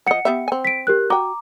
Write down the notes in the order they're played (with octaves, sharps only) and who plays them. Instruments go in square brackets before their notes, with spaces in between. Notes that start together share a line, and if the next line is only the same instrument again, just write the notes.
[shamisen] F3 D#5 [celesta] F#5 C#7
[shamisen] B3 G4 E5
C4 G#5
[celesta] B6 D7
G4 A#4 F#6
[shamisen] F#4 G5 [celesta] A#5 D6